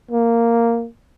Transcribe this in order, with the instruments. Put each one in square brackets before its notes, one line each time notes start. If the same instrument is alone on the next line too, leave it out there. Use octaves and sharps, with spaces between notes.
[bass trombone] A#3